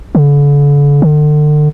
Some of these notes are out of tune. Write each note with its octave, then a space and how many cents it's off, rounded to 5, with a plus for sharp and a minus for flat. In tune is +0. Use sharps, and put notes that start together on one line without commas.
D3 -40
D3 +35